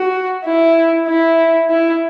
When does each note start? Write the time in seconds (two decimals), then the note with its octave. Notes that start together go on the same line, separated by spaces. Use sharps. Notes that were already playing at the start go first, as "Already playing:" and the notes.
Already playing: F#4
0.46 E4
1.08 E4
1.70 E4